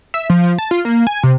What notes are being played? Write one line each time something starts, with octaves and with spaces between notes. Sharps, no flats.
E5
F3
F3
A5
F4
A#3
G#5
C3